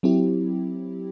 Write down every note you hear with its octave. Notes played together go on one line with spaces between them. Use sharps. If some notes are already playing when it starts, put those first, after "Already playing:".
F#3 C4 E4 G4